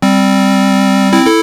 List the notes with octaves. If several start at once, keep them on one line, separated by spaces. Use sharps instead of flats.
G3 C4
C4 E4
E4 A4